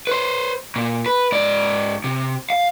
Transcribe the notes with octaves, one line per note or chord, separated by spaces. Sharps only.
B4 C5
A#2
B4
G#2 D5
C3
F5